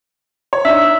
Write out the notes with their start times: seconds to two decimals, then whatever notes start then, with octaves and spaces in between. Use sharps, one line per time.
0.53 C#5
0.65 D4 D#4 E5 E6